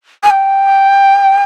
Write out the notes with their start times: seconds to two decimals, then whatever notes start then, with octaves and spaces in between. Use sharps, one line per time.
0.23 G#5
0.30 G5